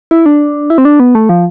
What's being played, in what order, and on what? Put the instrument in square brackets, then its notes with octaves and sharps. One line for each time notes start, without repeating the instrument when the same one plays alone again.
[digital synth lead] E4
D4
E4
C4
D4
B3
A3
F3